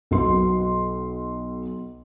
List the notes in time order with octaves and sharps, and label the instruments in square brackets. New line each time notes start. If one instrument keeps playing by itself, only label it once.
[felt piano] B1 B3 F#4 C6